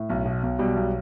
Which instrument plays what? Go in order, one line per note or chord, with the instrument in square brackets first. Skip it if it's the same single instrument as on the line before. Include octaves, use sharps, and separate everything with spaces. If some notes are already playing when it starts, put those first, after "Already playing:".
Already playing: [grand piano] A2
B1
B2
B1
B2 G3
B1